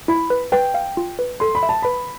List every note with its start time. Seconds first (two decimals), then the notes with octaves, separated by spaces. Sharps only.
0.08 E4 B5
0.30 B4
0.52 B4 G5
0.74 F5
0.97 F4
1.19 B4
1.40 A4 C6
1.55 B5
1.63 E5
1.69 A5
1.82 B4 B5